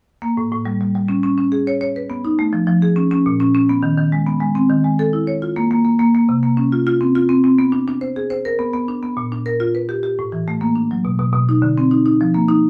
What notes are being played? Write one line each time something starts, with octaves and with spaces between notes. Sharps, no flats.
A#3
A2
A2
G3
G3
G3
C#4
C#4
C#4
G#4
C#5
C#5
B4
B3
D#4
A3
F3
F3
G#4
C#4
C#4
A#2
C#4
C#4
B3
D#3
D#3
G#3
B3
G#3
C4
D#3
G#3
A4
E4
C#5
F4
A#3
A#3
A#3
A#3
A#3
C3
A#3
C#4
F4
F4
C4
F4
C4
C4
B3
D4
D4
C5
G#4
C5
A#4
B3
B3
D4
B3
A#2
D4
A#4
F4
B4
G4
G4
A2
E3
A3
A#3
D4
F#3
B2
B2
B2
D#4
D3
C4
D#4
D#4
F3
A#3
D#4